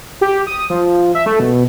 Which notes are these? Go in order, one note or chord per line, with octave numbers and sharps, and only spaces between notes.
G4
D#6
F3
E5
A3
B2